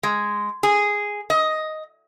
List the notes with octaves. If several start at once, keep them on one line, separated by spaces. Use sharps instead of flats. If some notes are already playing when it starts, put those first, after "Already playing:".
G#3
G#4
D#5